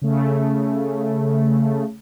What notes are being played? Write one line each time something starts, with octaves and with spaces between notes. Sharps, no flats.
C#3 A3